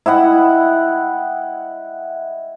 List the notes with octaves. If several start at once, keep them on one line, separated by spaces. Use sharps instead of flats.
E4 D#5 F#5 G5